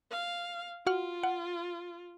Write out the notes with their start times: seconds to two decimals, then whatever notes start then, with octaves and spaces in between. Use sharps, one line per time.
0.11 F5
0.87 F4 F#4 F#5 F6
1.23 F#5